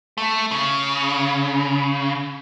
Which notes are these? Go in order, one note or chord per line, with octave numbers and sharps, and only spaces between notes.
A3
C#3